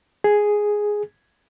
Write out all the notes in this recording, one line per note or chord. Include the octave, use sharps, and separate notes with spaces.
G#4